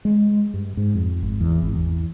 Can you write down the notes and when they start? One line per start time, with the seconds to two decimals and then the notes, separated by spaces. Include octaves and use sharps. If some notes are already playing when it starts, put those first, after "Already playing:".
0.05 G#3
0.54 G2
0.77 G#2
0.95 F2
1.23 G#1
1.41 E2
1.62 G#1
1.76 E2